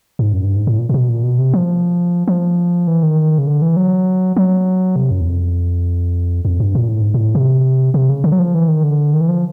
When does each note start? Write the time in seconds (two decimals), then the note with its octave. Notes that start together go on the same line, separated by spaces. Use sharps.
0.19 G#2
0.33 F#2
0.44 G2
0.56 G#2
0.67 A2
0.79 A#2
0.89 A#2
0.94 B2
1.09 A#2
1.23 B2
1.38 C3
1.53 F3
2.28 F3
2.87 E3
3.03 D#3
3.38 C#3
3.47 D3
3.62 E3
3.77 F#3
4.36 F#3
4.96 C3
5.11 F#2
5.21 E2
5.26 F2
6.45 F2
6.60 G2
6.75 A#2
6.88 A2
7.01 G#2
7.14 A2
7.35 C3
7.94 C3
8.09 C#3
8.24 D3
8.32 F#3
8.39 F3
8.54 E3
8.69 D#3
8.83 D3
9.14 D#3
9.21 E3
9.29 F3